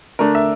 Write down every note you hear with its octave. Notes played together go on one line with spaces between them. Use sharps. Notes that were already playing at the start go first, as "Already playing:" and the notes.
D3 A3 D4 A#4
E5